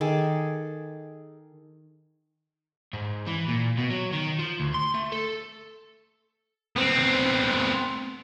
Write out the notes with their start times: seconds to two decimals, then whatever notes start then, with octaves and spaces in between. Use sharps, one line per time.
0.01 D#3 G#4 A4 D6
2.93 G#2
3.27 E3
3.48 A#2
3.77 B2
3.90 F#3
4.12 D#3
4.39 F3
4.60 D2
4.74 C6
4.94 A3
5.12 A4
6.76 B3 C4